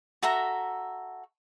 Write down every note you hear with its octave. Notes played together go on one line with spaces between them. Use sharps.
F#4 A4 E5 A#5